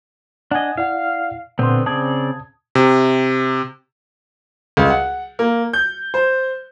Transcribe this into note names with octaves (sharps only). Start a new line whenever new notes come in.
D4 D#5 F#5 G#5 G#6
E4 D5 F5 F#5
A#2 D3 B3 C4 C6
C#3 C4 D5 A5 D#6 G#6
C3
C#2
F#5
A#3
G6
C5